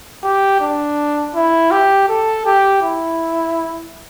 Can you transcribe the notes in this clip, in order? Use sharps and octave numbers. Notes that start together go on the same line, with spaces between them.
G4
D4
E4
G4
A4
G4
E4